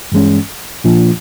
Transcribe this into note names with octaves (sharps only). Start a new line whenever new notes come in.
G2 E3 G#3 C#4
A#2 F3 A#3 D4 F4